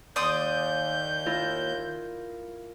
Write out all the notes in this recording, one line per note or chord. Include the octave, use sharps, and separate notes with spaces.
D#2 D5 C6 D#6 G6
E4 F4 A#4